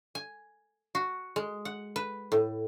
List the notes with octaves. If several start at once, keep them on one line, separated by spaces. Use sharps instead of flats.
G#5
F#4
G#3
F#5
B4
A2